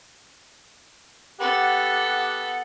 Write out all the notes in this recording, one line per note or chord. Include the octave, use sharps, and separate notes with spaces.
B3 G4 A4 F#5